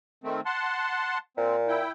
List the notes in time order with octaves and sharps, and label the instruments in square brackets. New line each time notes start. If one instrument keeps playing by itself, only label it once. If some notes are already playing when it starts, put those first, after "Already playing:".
[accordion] D#3 A3 C4
F#5 A5 C6
[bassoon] A#2 [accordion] C4
[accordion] E4 G5